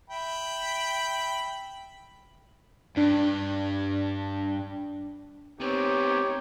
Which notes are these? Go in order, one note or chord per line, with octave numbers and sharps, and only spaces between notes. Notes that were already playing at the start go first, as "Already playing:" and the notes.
E5 G5 B5
G2 D4
B3 C4 D#4 G4 C#5